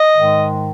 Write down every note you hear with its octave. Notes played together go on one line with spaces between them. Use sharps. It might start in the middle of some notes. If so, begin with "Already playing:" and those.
Already playing: D#5
G#2 D#3 G#3